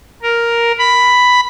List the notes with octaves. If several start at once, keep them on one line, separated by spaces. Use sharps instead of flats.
A#4
B5